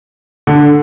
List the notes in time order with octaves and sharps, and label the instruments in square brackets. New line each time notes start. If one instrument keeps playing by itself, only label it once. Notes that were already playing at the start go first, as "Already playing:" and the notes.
[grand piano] D3